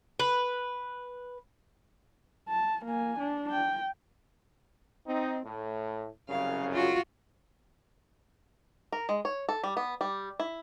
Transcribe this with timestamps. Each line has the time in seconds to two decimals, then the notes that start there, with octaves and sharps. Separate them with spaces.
0.20 B4
2.49 A5
2.85 A#3 G#5
3.19 D4
3.50 G5
5.07 C4 D#4
5.45 A2
6.29 C2 F#2 C#3 F5
6.72 F4 F#4
8.93 A#4
9.09 G#3
9.25 C#5
9.49 A4
9.64 G3
9.77 B3
10.01 G3
10.40 E4